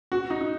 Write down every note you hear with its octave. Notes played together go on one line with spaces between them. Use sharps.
F#4
D#4
D#4